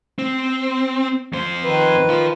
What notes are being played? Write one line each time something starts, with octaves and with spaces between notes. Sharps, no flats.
C4
F2 C5
D#3 B4
F4 C5